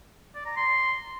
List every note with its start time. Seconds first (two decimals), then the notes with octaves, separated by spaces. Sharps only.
0.35 D5
0.46 A#5
0.57 C6